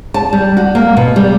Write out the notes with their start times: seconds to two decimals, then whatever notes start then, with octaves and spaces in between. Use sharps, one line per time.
0.14 A5
0.33 G3
0.57 F#4
0.75 A#3
0.97 B2
1.16 G3